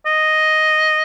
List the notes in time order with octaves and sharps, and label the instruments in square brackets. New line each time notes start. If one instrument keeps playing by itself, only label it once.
[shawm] D#5